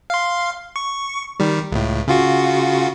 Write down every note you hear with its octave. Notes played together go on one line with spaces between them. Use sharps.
F5 C6
C#6
D#3 G3
C#2 A2
C#3 F4 F#4